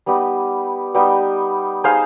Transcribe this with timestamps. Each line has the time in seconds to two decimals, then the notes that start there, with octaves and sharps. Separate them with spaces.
0.06 G3 B3 D#4 G4
0.94 G3 B3 D#4 G4
1.84 D#4 G#4 C5 F5